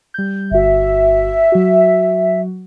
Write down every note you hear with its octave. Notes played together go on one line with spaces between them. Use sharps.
G3 G6
G1 F#4 E5
F#3 F#4